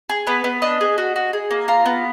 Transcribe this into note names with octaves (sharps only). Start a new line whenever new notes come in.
G#4
B3 B4
B3
D4 D#5
G#4
F#4
F#4
G#4
A#3
F4 A#5
B3